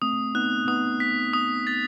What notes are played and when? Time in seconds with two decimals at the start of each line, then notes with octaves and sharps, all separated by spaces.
0.02 A3 C4 D#6
0.35 B3 D#4 F#6
0.67 B3 D#4 D#6
1.00 B6
1.33 D#6
1.67 A6